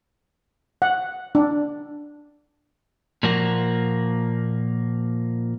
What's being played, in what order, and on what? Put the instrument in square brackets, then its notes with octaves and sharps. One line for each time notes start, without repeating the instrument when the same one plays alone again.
[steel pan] F#5
D4
[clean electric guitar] A#2 F3 A#3 F#4